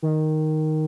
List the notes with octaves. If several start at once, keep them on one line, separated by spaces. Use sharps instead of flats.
D#3